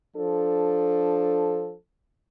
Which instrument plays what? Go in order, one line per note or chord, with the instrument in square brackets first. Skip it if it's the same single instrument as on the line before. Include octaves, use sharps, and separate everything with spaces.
[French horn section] F3 D4 A4